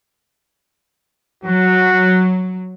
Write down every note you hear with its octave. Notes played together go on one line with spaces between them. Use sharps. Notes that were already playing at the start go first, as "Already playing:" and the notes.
F#3 F#4